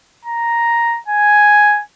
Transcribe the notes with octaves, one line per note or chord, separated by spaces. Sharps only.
A#5
G#5